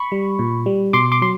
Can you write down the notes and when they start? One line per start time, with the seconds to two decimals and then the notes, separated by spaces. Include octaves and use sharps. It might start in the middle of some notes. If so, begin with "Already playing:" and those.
Already playing: B5 C#6
0.12 G3
0.39 A#2
0.66 G3
0.93 B2 C6 D6
1.12 C6 D6
1.22 F#3 C6